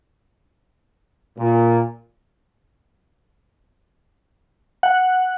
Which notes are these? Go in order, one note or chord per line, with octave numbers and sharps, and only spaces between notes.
A#2
F#5